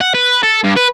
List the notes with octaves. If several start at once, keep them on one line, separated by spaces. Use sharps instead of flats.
F#5
B4
A4
G2
B4